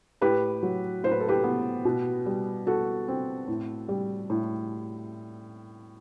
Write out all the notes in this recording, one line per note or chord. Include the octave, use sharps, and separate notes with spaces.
A2 G4 B4
F#3
A2 C5
B4
A4
G4 B4
B3
B2
G3
B2 F#4 A4
C4
A2
G3
A2